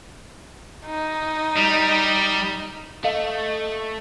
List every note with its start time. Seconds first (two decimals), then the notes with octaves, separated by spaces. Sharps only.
0.87 D#4
1.56 G3
3.04 A3 D#5 F5